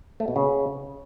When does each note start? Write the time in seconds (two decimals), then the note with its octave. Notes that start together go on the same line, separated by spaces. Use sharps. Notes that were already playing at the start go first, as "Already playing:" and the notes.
0.20 A3
0.28 B2
0.36 C#3